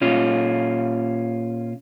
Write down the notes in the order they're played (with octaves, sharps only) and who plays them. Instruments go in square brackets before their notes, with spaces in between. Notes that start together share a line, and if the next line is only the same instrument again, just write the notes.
[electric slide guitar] A#2 C#4 F4